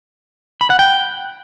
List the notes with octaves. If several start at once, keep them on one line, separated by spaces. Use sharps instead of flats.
B5
F#5
G5